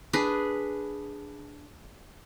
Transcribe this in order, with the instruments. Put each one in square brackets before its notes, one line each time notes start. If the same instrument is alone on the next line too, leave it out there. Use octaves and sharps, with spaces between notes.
[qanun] D4 G#4 B4